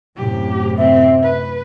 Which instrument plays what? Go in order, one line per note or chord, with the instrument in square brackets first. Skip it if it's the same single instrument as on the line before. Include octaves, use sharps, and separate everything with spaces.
[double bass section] F#2 A2 C3 [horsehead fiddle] G4
[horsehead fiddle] C4 [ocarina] E5
[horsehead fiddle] B4